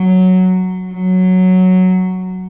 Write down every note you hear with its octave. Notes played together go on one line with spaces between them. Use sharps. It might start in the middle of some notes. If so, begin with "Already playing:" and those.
Already playing: F#3
F#3